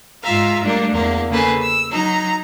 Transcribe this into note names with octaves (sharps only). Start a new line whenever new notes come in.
G#2 F4 E5 F5 A#5
G3 A3 A#3 D4
E2 A#3
C#3 A#3 A4 B4 G#5
E6
F#3 D#4 A#5